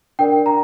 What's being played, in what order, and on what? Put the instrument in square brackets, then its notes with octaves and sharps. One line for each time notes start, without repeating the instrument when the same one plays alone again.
[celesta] D4 A#4 D5 G5
A#5